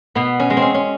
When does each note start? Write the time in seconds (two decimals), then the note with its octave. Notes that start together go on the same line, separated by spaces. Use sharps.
0.15 B2 B3
0.40 C#4
0.50 G#3
0.57 C4
0.62 C#4
0.74 C#4